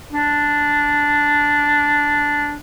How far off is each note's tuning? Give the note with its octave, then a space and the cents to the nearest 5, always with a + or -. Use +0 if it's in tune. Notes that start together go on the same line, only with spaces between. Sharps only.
D4 -5